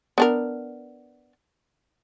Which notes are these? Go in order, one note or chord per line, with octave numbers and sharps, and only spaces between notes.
B3 D4 A#4